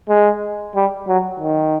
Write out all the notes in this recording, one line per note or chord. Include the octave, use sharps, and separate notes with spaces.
G#3
G3
F#3
D#3